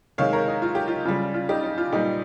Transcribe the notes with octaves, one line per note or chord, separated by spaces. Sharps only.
C3 D#3 G#3 C#5 F5
A#4 C#5
D#4
F4
G4
F4
C#3 G3 F4
F4
D#4 G4
D#4
F4
A#2 G3 D#4 G4